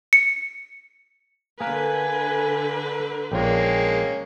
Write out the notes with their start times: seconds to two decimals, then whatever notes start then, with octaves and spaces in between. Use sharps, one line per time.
0.13 C#7
1.61 D3 A#3 A#4 B4 G#5
3.32 A#1 G#3 A#3 C#4 F4 G5